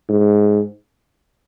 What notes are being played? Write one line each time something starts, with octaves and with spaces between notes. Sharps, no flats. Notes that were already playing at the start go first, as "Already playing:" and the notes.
G#2